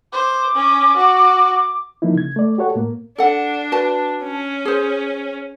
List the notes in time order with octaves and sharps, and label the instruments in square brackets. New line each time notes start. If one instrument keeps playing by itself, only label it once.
[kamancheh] C5 [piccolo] D6
[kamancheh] C#4
F#4
[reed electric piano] E3 F3 A#3 D#4 E4
C#3 G#6
A3 D5
F#4 G4 A4 C#5 F#5
A2 A#3
[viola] D4 [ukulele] A4 F#5
[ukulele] F#4 B4 A5
[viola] C#4
[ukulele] G#4 C5